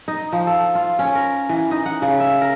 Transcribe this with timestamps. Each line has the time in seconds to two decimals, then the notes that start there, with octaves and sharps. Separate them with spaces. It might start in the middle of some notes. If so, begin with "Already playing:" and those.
0.08 D#4
0.33 F3
0.47 A4
0.75 F4
0.99 C#4
1.15 A#4
1.49 E3
1.71 D#4
1.86 F#5
2.02 C#3
2.20 E5
2.41 A#4